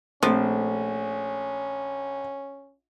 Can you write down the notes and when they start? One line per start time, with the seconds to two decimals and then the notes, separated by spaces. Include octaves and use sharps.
0.23 A#1 F3 A3 C4 C#4